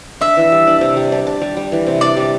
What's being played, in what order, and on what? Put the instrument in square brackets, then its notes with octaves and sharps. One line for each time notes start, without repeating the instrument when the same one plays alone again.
[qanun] D4 [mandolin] E5
[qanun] E3
G3
D4
C3
G3
D4
D4
G3
G3
E3
C3
[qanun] D4 [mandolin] D5
[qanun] G3